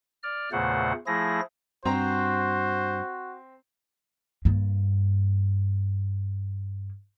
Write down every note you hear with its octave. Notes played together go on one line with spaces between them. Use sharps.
D5 F6
E2 A#2 C#3 A3 C5 F#5
F3 A3 E4 G#4 A#6
G2 C4 F#4 C5 A#5
G2 A#3